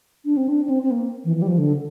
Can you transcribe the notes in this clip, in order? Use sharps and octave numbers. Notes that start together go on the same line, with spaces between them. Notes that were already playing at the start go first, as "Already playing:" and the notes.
D4
C4
D4
D4
C4
C4
A#3
E3
E3
G3
F3
D3